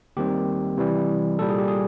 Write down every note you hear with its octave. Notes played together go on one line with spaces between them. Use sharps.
D#2 D#3 G3 C4 G4
C3 E3 G3
C2 A#2 G3 A4
G#4
G4
G#4